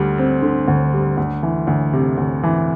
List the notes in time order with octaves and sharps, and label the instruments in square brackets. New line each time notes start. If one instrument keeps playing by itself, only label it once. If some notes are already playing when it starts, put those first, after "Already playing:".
Already playing: [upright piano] D2 G3
C4
D3
D2
G3
D2
E3
D2
C3
D2
E3